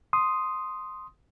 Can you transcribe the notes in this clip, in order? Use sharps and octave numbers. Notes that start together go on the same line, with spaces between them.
C6 D#6